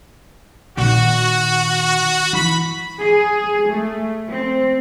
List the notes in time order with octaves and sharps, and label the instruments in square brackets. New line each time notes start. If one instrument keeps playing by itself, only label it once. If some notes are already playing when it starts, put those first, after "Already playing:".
[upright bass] A#2 D#3 [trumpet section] F#4
[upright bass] E3 [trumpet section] B5
[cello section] G#4
A3
C4